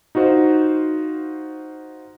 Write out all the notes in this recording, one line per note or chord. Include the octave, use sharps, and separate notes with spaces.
D#4 F4 F#4 C5